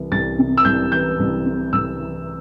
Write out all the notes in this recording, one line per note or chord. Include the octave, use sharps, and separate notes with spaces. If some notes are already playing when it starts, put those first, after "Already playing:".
Already playing: C2 E3
C2 A6
C3
E6
C2 G6
E3 G6
C2
C3
C2 E6
E3